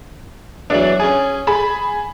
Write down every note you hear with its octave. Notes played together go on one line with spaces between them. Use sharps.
E2 E3 F#3 D4
C#4 G#4 G#5
G#4 A5 B5